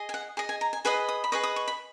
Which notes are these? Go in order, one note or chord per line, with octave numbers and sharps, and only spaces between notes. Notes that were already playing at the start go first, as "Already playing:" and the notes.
Already playing: G#4 D#5
G#5
F#5
G#4 D#5
G#5
A#5
G#5
G#4 B4 D#5 F#5
D#6
B5
G#4 B4 D#5 C#6
D#6
C#6
B5